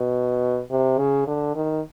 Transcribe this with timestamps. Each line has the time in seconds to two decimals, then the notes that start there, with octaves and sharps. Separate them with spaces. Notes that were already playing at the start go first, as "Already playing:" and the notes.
Already playing: B2
0.71 C3
0.98 C#3
1.27 D3
1.55 D#3